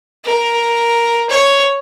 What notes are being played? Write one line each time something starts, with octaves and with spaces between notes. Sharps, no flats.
A#4
C#5